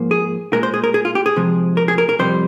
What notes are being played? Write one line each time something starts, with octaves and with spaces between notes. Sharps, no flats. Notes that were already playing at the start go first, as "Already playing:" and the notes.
Already playing: G#2 F3 A#3
G#4
A#2 G#3 A#4
C5
G#4
A#4
G#4
F4
G4
G#4
C3 F3 G#3
A#4
G#4
A#4
A#4
F2 C3 G3 C5